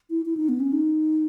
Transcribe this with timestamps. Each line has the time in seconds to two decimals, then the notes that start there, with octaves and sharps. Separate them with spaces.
0.10 E4
0.26 E4
0.37 D#4
0.49 B3
0.60 C#4
0.72 D#4